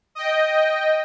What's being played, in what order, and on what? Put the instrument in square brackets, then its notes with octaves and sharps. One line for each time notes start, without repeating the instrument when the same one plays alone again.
[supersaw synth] D#5 G5